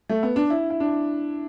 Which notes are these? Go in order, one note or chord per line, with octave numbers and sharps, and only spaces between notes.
A3
B3
D4
E4
E4
D4